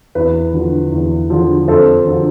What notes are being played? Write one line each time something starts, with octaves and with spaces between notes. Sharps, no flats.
E2 B4
D3 F3
E2
D3 F3
F2 A4 C5
D3 F3